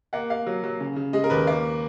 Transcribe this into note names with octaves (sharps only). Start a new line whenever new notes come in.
A#3 F#5
A#3 F5
F#3
F#3
C#3
C#3
G#3 D#5
A#4
D#2 B4
A#3